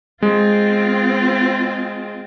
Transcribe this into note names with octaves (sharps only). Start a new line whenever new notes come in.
G#3 C4 F4